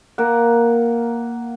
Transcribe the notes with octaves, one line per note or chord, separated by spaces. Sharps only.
A#3 A#4 F#5